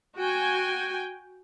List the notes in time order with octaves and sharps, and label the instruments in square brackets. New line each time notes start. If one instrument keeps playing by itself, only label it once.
[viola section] F#4 G5 G#5